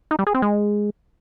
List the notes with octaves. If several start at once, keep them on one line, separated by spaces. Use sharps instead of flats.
D#4
G3
G#4
C4
G#3